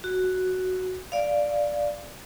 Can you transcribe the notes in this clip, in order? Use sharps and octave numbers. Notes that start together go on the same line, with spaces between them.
F#4
D5 F5